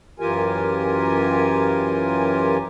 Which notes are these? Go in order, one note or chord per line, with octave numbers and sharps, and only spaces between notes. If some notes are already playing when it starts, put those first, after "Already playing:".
F#2 E3 F4 G4 A#4 G#5